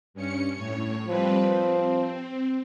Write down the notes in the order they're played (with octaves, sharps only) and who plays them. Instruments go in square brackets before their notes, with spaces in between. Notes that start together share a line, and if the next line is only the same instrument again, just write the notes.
[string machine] G2 C#4 C#7
A2 C#5
[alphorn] F3 [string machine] G3 C4 B4
[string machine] C4